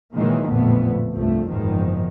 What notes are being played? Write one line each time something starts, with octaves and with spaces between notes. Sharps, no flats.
A#2 D#3 E3 F#3 G#3 A#3
A1 F2 A#2 D3 A3 B3
C2 G2 F3 A3
F#1 E2 G#2 D#3 F3